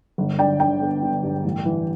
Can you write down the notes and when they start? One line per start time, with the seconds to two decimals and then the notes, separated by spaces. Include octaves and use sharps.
0.18 G1
0.38 D3 D5 G5
0.59 D3 D5 G5
0.81 B3
1.03 D3
1.23 G2
1.44 A1
1.65 E3